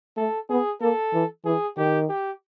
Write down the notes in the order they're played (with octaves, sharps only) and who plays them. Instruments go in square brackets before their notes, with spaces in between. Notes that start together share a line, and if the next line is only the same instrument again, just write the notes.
[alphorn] A3 [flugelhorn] A4
[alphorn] B3 [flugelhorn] G#4
[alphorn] A#3 [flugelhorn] A4
[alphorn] E3
[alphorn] E3 [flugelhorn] G#4
[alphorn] D#3 [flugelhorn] G4
[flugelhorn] G4